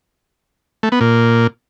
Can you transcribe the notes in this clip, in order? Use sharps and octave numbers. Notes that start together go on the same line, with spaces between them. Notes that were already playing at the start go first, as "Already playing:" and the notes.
A3
B3
A#2